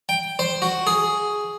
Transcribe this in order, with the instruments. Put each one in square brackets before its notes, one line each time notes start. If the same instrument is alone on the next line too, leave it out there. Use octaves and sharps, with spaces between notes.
[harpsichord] G5
C5
F#4
G#4